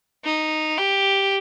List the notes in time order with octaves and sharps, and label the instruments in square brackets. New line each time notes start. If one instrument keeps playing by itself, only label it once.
[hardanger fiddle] D#4
G4